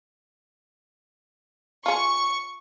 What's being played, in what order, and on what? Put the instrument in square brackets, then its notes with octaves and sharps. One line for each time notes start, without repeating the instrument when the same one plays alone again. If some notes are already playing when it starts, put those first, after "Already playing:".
[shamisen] F4 G#4 [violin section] C#6